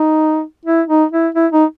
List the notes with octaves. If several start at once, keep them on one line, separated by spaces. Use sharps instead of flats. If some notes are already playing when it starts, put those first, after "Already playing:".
Already playing: D#4
E4
D#4
E4
E4
D#4